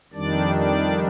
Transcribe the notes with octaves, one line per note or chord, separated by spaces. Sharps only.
F2 D#3 G3 D4 D5
D5